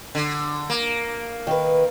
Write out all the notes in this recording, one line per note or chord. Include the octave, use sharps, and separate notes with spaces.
D3
A#3
D#3 B4